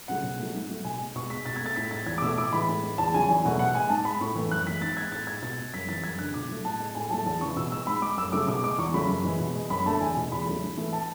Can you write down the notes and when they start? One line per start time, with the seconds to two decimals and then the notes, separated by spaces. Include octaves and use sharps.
0.08 C#3 F#3 A3 F#5
0.23 B2
0.40 F#3 A3
0.54 G#2
0.69 F#3 A3
0.84 B2 G#5
0.99 G#3
1.16 B2 C#6
1.30 G#3 B6
1.46 B2 A6
1.56 G#6
1.61 A3 A6
1.76 A2 B6
1.91 G#3 A6
2.06 E2 G#6
2.18 D6
2.22 B2 A3 E6
2.37 A2 D6
2.53 E3 G#3 B5
2.69 A2
2.83 G#3
2.98 E2 A5
3.14 C#3 F#3 G#5
3.29 E2 G#5
3.45 B2 F#3 A3 F#5
3.59 B2 F#5
3.75 G#3 G#5
3.90 G#2 A5
4.05 G#3 B5
4.21 A2 C#6
4.35 E3 A3
4.51 F#2 F#6
4.67 E3 G#3 B6
4.81 G#2 A6
4.97 G#3 G#6
5.12 A2 A6
5.27 G#3 G#6
5.42 B2 A6
5.58 G#3
5.74 F#2 B6
5.88 E3 G#3 A6
6.04 F#2 G#6
6.19 D3 G#3 F#6
6.34 B2 D6
6.49 F#3 A3
6.65 A2 A5
6.80 G#3
6.95 A2 G#5
7.11 F#3 A3 A5
7.26 E2 A5
7.41 C#3 E3 C#6
7.57 B2 E6
7.72 G#3 E6
7.87 G#2 B5
8.02 G#3 D6
8.17 F#2 E6
8.32 C#3 F#3 A3 D6
8.48 B2 D6
8.64 G#3 D6
8.78 E2 C#6
8.94 C#3 F#3 A3 B5
9.09 F#2
9.25 E3 G#3
9.40 B2
9.55 G#3
9.70 F#2 B5
9.86 D3 A3 A5
10.01 E2 G#5
10.16 B2 G#3
10.32 E2 B5
10.46 C#3 F#3 A3
10.63 G#2
10.77 E3 A3
10.93 A5